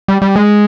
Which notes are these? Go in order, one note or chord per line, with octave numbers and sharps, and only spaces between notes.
G3
G3
G#3